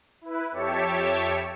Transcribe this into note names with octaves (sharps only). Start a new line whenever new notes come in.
E4 B4
F2 G4 C#5 E5 A5 C#7